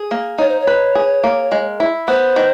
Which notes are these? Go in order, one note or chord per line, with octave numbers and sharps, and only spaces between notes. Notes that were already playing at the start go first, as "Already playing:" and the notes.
Already playing: G#4
A#3
D#4 C#5
C5
C#5
B4
G#4
A#3
G#3
E4
B3 C5
D#3